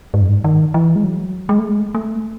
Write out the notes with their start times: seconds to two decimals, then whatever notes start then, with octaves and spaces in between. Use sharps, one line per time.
0.14 G#2
0.21 F#2
0.29 G#2
0.44 D#3
0.74 E3
0.96 G#3
1.04 F#3
1.49 G#3
1.59 A3
1.69 G#3
1.95 A3